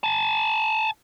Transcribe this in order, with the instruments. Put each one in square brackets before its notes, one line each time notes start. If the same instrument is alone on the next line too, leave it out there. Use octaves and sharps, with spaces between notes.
[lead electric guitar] G#5 A5